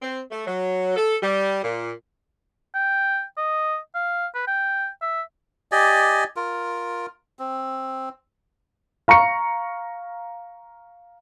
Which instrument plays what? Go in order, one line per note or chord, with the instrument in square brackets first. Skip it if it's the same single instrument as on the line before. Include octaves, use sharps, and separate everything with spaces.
[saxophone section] C4
A3
F#3
A4
G3
A#2
[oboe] G5
D#5
F5
B4
G5
E5
[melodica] G4 D5 D#5 G#5
F4 A#4
C4
[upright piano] F5 A#5 C#6 C#7